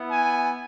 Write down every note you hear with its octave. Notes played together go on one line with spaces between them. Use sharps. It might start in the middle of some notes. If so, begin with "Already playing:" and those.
Already playing: B3 E4
G#5